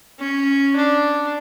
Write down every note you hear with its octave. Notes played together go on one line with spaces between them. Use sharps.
C#4
D4